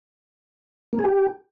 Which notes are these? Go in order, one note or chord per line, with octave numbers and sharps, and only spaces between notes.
A#3
G#4
G4